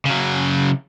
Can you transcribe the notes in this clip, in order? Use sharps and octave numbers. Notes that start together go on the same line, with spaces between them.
C#3 F#3